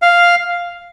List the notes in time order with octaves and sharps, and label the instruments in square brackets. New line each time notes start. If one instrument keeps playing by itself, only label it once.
[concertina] F5